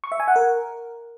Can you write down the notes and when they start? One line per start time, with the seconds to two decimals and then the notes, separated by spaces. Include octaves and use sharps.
0.04 C#6
0.12 E5
0.20 G#5
0.28 F#5
0.36 A#4